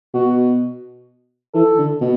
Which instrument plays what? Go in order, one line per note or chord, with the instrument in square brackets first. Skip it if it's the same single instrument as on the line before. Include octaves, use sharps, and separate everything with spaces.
[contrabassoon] B2 [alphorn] F#4
[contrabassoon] E3 [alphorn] A4
[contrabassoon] D3
B2